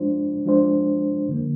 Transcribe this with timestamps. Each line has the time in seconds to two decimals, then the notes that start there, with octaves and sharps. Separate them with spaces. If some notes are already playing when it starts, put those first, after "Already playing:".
Already playing: F3 G#3 D4 F4 C5
0.46 F3 G#3 D4 F4 C5
1.29 D3 F3 A#3